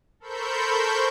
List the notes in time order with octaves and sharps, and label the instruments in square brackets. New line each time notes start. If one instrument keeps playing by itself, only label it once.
[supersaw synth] A4 A#4 C5 B5 C#6 G6